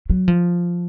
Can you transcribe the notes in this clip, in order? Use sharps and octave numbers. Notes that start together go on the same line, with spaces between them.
F#3
F3